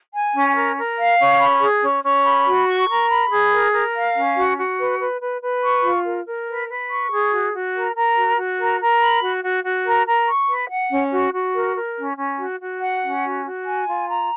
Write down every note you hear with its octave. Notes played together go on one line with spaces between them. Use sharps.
G#5
C#4
A#4
A#4
F5
C#4
B5
G#4
C#4
C#4
B5
F#4
C#6
A#4
B5
G#4
A#4
A#4
F5
C#4
F#4
F#4
B4
B4
B4
B4
C#6
F4
A#4
A#4
B4
B4
C#6
G#4
F#4
F#4
A#4
A#4
F#4
F#4
A#4
A#4
B5
F#4
F#4
F#4
A#4
A#4
C#6
B4
F#5
C#4
F#4
F#4
A#4
A#4
C#4
C#4
F#4
F#4
F#5
C#4
F#4
F#4
G#5
F4
A#5